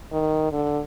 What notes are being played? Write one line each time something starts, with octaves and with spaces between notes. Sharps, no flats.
D#3
D3